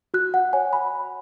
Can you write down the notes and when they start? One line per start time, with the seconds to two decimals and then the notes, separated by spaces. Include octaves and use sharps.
0.14 F#4 F#6
0.34 F#5
0.53 C#5 G#5
0.73 B5